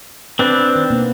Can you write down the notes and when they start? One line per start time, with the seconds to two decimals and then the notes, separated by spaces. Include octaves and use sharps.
0.39 C4 D4 B4
0.76 D#3
0.90 B2 A#3 B3